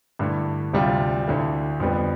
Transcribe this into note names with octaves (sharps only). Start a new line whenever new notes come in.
G2 D3 A3 E4
D2 C3 G3 D4 F4
D2 D3 A3 E4
F2 D3 G3 B3